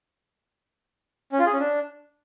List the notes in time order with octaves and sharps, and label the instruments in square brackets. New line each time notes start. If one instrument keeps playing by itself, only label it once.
[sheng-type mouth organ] C#4
F4
G#4
C#4
D4